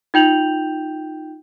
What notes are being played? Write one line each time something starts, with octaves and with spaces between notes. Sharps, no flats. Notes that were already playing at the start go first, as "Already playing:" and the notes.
D#4 F4 G5 G6 F7 F#7